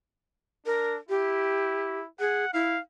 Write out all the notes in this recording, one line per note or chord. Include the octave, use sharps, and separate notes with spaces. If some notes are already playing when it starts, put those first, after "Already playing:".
D4 A#4
E4 G4
G#4 F#5
E4 F5